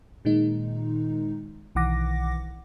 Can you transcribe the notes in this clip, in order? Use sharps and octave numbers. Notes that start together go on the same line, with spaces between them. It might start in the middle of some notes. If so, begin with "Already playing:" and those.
A#2 D#3 G#3 D#4
B1 D#3 E3 F#5 D6 A#6